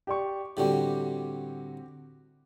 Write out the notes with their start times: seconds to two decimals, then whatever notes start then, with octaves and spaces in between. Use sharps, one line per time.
0.07 G4 D5 C#6
0.57 A2 D3 G3 C4 F#4 G4